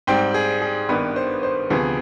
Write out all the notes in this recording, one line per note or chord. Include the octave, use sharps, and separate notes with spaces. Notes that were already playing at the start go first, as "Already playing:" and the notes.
G#2 G3 C4 G5
G#4
G#4
G#1 G2 D#3 B3 B4
C5
C5
D2 C3 F3 B3 G#4